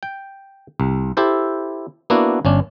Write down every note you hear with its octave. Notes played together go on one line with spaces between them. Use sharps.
G5
C2
E4 G4 A4 C5
A#3 B3 D4 E4 F#4
G1 C#4 D4